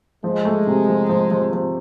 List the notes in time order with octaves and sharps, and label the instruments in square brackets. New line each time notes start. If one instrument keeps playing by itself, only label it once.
[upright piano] F3 [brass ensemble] G#3
[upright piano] A3
C3
F3
F3
F3
F3